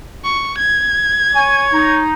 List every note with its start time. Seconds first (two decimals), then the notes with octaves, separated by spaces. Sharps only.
0.24 C#6
0.58 G#6
1.35 C#5 G#5
1.73 D#4